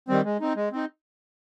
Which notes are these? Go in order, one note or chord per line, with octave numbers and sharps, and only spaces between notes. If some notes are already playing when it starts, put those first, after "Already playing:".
D#3 G3 C4
G#3
C4 D#4
G#3
C4 D#4